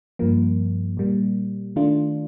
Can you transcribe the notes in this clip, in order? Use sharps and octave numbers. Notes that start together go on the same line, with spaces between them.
G2 F3 A#3
A#2 G3 A#3
D#3 A3 D4 F4